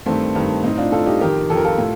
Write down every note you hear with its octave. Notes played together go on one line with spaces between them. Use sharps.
G2 D#3 A3 C4
G2 D#3
A2 C4 D#4
D4 F4
A2 F4 A4
D#4 G4
F2 D#3 G4 A#4
F2 D#3 A4
A#4
F4 A4
A2